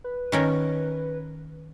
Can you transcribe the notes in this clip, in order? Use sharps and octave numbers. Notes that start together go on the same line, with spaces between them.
B4
D#3 C#4 A#4